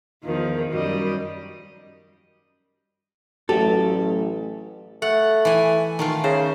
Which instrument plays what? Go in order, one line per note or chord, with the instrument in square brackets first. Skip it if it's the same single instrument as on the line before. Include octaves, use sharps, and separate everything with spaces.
[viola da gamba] E2 D#3 F3
F#2 G3 D#5
[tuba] A1 [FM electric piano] F#3 A3 [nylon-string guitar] G4 [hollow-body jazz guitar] A4
[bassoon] A3 [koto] F#5
[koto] E3 G#5
D#3 A3 F4
[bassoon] C#3 [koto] C5